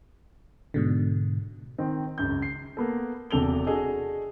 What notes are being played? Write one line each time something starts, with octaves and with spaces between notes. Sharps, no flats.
G#2 B2 D3
D#3 C4
C#2 F#2 G6
C7
A#3 B3 A4
E1 E2 C3 A4 F7 G7
D4 F#4 G#4 A4 D#5